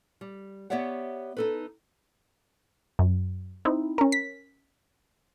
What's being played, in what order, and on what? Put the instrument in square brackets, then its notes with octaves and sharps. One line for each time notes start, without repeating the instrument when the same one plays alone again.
[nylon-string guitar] G3
B3 G4 C#5 D5 E5 F#5
D#4 A4 B4
[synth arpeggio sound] F#2
C4 D#4 E4
C#4 A#4
B6